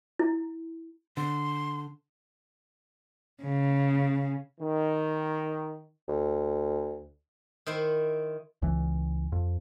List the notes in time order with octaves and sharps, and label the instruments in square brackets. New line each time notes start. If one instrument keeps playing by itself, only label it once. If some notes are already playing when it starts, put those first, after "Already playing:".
[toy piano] E4
[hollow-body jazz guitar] D3 [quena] C6
[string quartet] C#3
[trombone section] D#3
[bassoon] D2
[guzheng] D#3 E4 C5
[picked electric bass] C#2 E3
F2